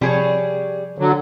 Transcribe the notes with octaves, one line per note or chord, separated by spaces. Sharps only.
C3 F3 G3 G#4 C#5 B5
D3 F#3